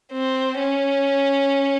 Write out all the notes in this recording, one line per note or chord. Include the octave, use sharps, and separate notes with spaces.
C4
C#4